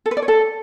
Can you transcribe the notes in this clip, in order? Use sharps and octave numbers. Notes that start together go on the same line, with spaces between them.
A4
B4
D5
C#5
A4